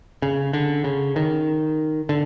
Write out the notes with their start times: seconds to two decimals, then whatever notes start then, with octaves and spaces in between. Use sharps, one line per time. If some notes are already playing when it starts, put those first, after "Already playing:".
0.22 C#3
0.53 D3
0.84 C#3
1.16 D#3
2.09 D3